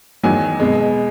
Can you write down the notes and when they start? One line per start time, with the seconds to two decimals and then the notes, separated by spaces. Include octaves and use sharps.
0.23 E2 D#3 F#3 G#5
0.60 B2 G#3